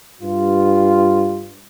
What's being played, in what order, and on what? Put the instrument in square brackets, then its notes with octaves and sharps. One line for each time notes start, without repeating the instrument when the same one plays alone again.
[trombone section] G2 F4